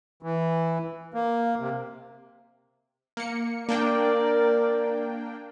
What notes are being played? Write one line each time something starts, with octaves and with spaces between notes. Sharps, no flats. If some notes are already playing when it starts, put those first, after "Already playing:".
E3
A#3
C3
A#3 C#7
A#3 D4 A#4 D5 G5